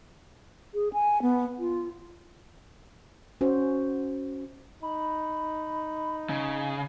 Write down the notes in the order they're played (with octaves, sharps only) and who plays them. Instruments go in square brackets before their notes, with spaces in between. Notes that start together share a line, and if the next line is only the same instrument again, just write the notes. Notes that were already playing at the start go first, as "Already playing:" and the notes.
[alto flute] G#4
G#5
B3
F4
[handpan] C#4 F#4 C5
[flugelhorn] D#4 [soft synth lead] B5
[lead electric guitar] C#3